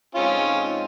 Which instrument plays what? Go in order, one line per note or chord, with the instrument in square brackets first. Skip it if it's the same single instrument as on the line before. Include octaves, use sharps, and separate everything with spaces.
[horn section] G#2 F3 G#3 C4 D#4 [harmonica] C#4 F4